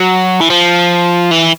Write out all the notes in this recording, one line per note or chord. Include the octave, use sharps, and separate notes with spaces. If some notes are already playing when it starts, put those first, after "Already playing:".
Already playing: F#3
E3
F3
E3